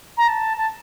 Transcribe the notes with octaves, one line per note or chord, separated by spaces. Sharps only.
A#5
A5
A5